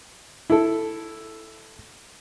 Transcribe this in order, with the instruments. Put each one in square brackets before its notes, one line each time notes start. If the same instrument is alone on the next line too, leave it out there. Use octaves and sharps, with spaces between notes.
[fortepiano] E4 A4